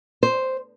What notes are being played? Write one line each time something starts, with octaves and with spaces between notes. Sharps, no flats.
C5